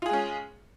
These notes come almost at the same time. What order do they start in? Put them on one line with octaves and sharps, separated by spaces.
F4 G#4 G#3 C#4